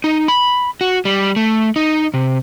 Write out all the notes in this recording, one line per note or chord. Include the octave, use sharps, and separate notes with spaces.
D#4
B5
F#4
G3
A3
D#4
C3